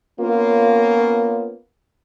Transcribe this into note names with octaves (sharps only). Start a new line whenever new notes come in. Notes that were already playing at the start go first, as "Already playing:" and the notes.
A#3 B3 C#4 F4